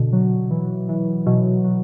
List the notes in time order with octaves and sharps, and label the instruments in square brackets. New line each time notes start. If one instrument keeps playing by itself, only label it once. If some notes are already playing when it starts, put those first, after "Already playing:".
Already playing: [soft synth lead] B2 [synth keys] D3
[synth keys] F#3
E3
E3
[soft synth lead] B2 [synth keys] F#3
[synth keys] F#3